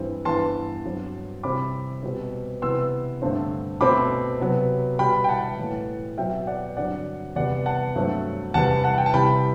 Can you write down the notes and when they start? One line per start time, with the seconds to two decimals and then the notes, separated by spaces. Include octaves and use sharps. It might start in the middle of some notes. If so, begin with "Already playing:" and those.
Already playing: G2 E3 G3 C4
0.25 G2 E3 B3 A5 C6
0.85 G2 F#3 C4
1.43 C3 E3 G3 C4 B5 D6
2.03 B2 G3 C4
2.62 C3 E3 B3 C6 E6
3.22 G2 D3 A3 C4
3.81 B2 A3 C4 B5 D6
4.40 C3 F#3 B3
4.99 B2 G3 B3 G5 B5
5.24 G5
5.29 F#5 A5
5.58 A2 E3 A3
6.18 B2 F#3 C4 E5 G5
6.47 D5 F#5
6.77 G2 D3 F#3 C4 D5 F#5
7.36 E2 C3 G3 B3 D5 F#5
7.66 F#5 A5
7.95 G2 F#3 A3 C4
8.54 E2 C3 G3 B3 F#5 A5
8.84 F#5 A5
8.98 G5
9.06 A5
9.14 C3 E3 G3 G5 B5